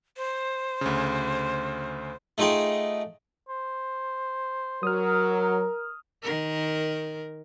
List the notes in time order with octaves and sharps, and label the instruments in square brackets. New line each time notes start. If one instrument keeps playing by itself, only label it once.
[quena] C5
[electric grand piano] D2 C#3
[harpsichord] A3 D#4 F4 G#4 G5
[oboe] C5
[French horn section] F#3 [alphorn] A#4 [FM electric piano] D#6 F6
[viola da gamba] D#3 A#4